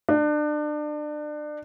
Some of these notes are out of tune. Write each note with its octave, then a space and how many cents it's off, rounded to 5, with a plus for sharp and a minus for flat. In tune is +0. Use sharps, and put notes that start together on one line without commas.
D4 +30